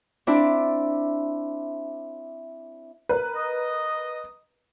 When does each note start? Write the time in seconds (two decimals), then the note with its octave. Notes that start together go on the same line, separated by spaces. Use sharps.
0.27 C4 D4 E4 D5
3.09 A#4 B4
3.36 D#5